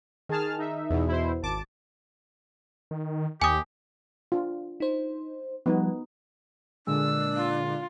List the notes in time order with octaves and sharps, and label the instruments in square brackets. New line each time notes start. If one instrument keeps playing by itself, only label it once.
[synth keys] D#3 [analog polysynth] G#4 A5 F6
[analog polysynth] D#4 E5
[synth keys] E2 B2
[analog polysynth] E4 C5
[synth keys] G#1 D6 [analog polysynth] A5
[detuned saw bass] D#3
[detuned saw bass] D#2 [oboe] G4 [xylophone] G#5 D#6
[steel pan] D4 F4
[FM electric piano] D#4 C5
[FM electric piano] F3 G3 [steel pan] B3 D#4
[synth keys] A#2 D3 G#3 [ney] D4 [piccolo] E6
[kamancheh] F4